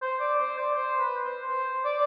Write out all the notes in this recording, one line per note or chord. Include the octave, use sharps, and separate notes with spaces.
C5
D5
C5
D5
C5
B4
C5
C5
D5